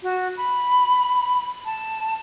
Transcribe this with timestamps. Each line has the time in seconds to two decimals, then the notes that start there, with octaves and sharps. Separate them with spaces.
0.03 F#4
0.37 B5
1.65 A5